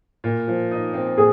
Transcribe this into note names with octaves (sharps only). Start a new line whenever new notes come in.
A#2
F3
D#4
C4
A#2 G#4